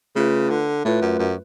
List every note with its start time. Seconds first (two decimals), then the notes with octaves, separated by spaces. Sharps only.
0.16 C#3 A3 F4 B4
0.50 D3
0.85 A2 A3 F4 B4
1.02 F#2
1.19 F#2